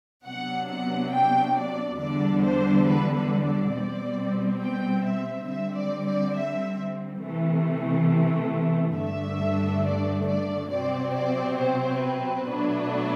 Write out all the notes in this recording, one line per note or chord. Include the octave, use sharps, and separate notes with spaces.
C3 F#3 B3 D4 F#5
F#5
G5
D5
E2 D3 G3 D4 D5
C5
B4
B4
D5
B2 G3 C4
G5
E5
D3 G3 C4 E5
D5
D5
E5
C3 E3 A3
G2 D3 A3 D4 E5
D5
D5
C3 F#3 C4 D5
D5
C5
B4
B2 F#3 A3 D4